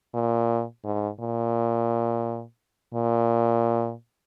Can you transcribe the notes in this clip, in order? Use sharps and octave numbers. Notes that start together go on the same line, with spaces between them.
A#2
G#2
A#2
A#2